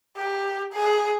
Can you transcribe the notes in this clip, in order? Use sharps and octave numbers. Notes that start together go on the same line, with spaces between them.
G4
G#4